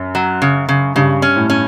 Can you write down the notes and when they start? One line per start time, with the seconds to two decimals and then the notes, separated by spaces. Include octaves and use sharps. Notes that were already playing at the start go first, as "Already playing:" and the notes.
Already playing: F#2
0.15 F#3
0.42 C#3
0.69 C#3
0.95 G2 C#3
1.22 C#4
1.36 A2
1.50 C#4